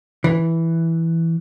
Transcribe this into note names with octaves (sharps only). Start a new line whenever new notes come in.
E3